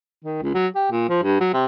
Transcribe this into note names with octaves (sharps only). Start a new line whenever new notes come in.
D#3
C#2
F#3
G4
A#2
F3
G2
F#3
C3